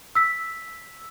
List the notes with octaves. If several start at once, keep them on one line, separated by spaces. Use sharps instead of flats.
E6 B6